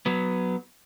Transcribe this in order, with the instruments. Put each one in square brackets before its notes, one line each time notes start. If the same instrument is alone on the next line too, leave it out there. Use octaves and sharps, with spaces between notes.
[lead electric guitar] F#3 B3